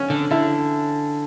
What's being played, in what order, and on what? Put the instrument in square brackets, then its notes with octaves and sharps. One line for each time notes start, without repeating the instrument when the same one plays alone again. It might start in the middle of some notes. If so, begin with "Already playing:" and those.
Already playing: [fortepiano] C#4
[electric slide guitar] D3
[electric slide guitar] D3 [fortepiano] E4